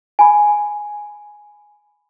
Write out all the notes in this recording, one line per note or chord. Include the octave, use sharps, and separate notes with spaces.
G#5 B5